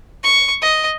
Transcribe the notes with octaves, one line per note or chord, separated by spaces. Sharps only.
C#6
D#5